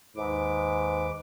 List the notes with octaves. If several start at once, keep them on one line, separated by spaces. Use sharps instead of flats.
D#2 G#2 B4 D6